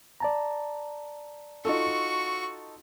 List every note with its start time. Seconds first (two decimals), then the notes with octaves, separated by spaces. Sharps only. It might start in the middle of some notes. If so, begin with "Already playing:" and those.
0.20 D5 A5 A#5
1.65 D#4 F4 F#4 A4 C#6